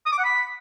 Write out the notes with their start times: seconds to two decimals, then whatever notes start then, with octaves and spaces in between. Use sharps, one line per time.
0.06 D#6
0.12 D6
0.18 F#5
0.24 B5